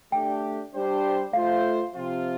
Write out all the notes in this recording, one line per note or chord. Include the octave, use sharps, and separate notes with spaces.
A3 D4 G4 G5
G3 D4 G4 C5
A3 F4 C5 F5
C3 F3 C4 F4